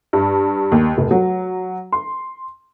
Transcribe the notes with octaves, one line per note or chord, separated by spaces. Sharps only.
G2
D#2
F1
F#3
C6